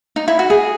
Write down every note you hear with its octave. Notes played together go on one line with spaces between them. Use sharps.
D#4
E4
F#4
G#4